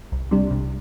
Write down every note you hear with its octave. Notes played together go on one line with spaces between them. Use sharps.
C2
C3 G3 D4
C2